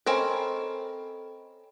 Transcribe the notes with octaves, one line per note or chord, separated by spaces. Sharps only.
C4 C#4 A4 A#4 D#5 B5